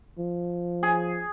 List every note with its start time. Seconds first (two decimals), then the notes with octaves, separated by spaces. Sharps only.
0.19 F3
0.83 G#4